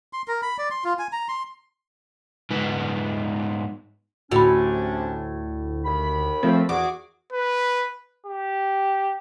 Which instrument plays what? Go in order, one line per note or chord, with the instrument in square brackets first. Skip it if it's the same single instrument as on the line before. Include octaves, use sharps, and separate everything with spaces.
[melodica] C6
A#4
B5
D5
C6
F4
G#5
A#5
C6
[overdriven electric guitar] G#2 B3
[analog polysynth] D2 [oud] A2 [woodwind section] C3 C#4 D4 [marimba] F#4 B5
[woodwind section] D#2 D#3 B5
[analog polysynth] F3 A3 C4 [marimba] A#4
[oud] E2 [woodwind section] F#4 G#4 [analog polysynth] D6
[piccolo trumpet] B4
[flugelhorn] G4